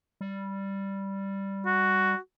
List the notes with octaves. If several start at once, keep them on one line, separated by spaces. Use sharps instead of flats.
G3
F#4